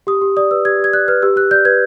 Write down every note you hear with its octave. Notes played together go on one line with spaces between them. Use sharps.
G4 D#6
G4
D5 D#6
B4 E6
G4 G#6
G4
G#6
D5 F#6
B4 F6
G4 E6
G4 F#6
D5 G6
B4 G#6